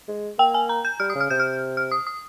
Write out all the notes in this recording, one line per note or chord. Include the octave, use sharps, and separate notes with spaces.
G#3
A#3 G5
G#5
A#5
G6
G3 F6
D#6
C#3
F6
C3 G6
F6
F6
D#6
D#6